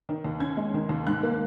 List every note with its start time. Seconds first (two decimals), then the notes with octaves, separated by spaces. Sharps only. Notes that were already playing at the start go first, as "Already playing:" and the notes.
0.09 D#3
0.24 D#2
0.40 C#4 G#6
0.57 G#3
0.74 D#3
0.89 D#2
1.07 G#2 F#6
1.23 A#3